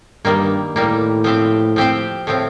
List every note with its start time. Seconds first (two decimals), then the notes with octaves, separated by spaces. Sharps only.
0.25 G2 D#3 G3 A#3
0.75 A2 D#3 G3 A#3
1.24 F3 C4 G4 C5
1.76 F3 C4 G4 C5
2.27 A2 F3 C4